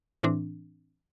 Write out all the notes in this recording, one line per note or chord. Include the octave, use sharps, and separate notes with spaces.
A2 E3 C4 D4